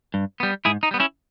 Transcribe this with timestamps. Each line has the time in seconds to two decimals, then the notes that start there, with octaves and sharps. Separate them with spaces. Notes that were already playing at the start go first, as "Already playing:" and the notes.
0.14 G2
0.40 G3 B3
0.65 G#2 E4 G#4
0.83 D#4
0.91 G3 B3
1.00 C#4 E4